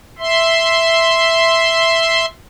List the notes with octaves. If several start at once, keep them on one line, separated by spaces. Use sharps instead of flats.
E5 C6